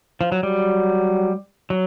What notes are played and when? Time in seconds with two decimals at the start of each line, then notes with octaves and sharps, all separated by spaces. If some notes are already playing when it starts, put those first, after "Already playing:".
0.21 F3
0.32 F#3
0.43 F#3 G3
1.70 F#3